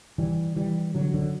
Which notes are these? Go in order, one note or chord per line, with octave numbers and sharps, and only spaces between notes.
E3 G3
E3 G3
D3 F#3
D3 F#3